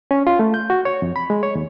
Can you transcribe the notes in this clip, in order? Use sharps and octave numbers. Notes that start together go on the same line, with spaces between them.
C#4
F4
A3
G6
F#4
C#5
F2
B5
G#3
C#5
D#2